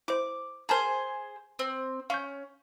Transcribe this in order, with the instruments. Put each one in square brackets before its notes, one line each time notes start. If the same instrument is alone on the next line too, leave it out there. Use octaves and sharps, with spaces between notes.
[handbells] E4 C5 [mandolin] D6
[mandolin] G#4 C5 [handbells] A#4 A5 A#5
[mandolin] C4
[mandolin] C#4 [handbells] F5 C#6 G6